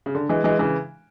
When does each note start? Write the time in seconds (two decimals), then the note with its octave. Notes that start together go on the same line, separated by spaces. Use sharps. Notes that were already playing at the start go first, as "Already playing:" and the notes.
0.06 C#3
0.15 D3
0.29 E3 G#3
0.44 E3 G#3
0.59 C#3 E3